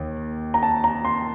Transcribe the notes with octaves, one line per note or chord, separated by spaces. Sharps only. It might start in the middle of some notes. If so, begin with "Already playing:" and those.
Already playing: D#2 D#3
A#5
A5
A#5
C6